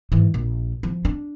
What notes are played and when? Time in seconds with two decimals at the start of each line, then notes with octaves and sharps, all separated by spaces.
0.12 G#2 E3
0.34 A#1
0.83 F3
1.05 D4